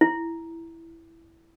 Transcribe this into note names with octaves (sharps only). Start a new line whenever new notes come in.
E4